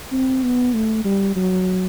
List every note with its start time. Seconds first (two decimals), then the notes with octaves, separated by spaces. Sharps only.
0.12 C4
0.43 B3
0.74 A3
1.05 G3
1.36 F#3